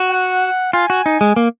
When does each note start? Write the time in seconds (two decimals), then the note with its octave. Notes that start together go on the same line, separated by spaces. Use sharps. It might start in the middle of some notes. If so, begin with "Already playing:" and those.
Already playing: F#4
0.09 F#5
0.73 F4 G#5
0.90 F#4
1.06 D#4
1.21 G#3
1.36 A#3